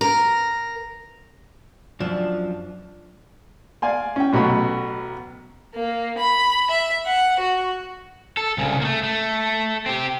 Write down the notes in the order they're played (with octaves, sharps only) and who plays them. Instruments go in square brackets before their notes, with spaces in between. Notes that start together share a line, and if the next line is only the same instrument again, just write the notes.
[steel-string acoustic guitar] A#4
[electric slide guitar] F#2 F3 [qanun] D4
[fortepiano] D5 F5 G#5 C6
C#4 G5
A1 B2 F#3 B4 B5
[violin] A#3
B5
E5
F#5
F#4
[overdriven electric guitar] A4
C2 C#3
A3 A#3
A3
C4 G4